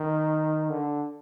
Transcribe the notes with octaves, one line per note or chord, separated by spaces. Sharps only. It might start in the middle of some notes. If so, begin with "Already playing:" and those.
Already playing: D#3
D3